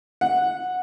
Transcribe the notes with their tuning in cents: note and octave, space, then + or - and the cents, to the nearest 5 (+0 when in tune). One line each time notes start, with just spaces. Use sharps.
F#5 -15